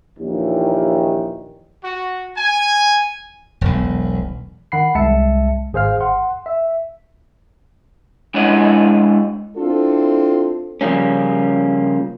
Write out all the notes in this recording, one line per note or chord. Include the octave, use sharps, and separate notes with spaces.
A#1 D#2 A#2 D#3 E3
F#4
G#5
E1 B1
D#3 F#5 B5 C7
C2 G#3 E5 A5 C#7
G#1 G#4 C5 F5 F6
F#5 C6
E5
G#3 D4 E4 C#5 D#5 F#5
C4 D4 E4 F4 A4
C#3 F3 G3 A#3 C#4